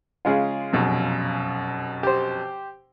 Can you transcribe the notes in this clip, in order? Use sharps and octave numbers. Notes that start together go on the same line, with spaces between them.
C#3 G#3 F4
F1 F#2 B2
G4 C5